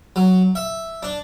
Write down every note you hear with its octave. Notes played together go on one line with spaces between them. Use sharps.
F#3
E5
D4